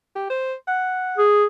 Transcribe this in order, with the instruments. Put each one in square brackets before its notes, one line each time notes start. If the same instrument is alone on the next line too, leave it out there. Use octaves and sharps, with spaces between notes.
[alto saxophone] G4
C5
F#5
[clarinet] G#4